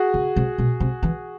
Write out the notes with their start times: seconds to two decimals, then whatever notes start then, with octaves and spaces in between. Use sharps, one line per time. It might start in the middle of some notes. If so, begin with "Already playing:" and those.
Already playing: F#4 G#4
0.14 C#3
0.36 C3
0.58 B2
0.80 C3
1.03 E3